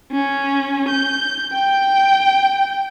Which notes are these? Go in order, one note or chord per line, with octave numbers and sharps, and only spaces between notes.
C#4
G6
G5